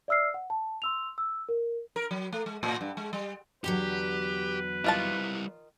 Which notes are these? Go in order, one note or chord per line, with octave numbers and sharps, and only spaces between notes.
D5 E5 E6 F6 C7
F#5
A5
C6 E6 F7
E6
A#4
A#4
F#3
A3
G#3
A2
G2
G#3
G3
E2 D3 F#3 G4 B4
D#3 G3 E4 F4 A5